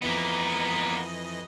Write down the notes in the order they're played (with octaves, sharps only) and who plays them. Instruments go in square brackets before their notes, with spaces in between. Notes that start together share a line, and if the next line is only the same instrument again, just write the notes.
[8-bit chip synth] F2 E3 D#5 [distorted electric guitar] A#3 B3